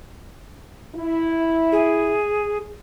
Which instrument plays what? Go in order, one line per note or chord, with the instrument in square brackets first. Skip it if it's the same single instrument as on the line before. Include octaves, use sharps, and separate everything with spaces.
[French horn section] E4
[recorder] G#4